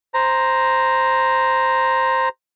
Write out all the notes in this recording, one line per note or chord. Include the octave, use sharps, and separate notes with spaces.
C5 A#5